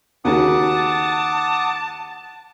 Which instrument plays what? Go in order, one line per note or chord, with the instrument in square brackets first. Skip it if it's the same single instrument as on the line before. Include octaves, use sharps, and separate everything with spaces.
[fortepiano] D#2 C#3 F#4 [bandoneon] F#5 D6 D#6 [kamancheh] A5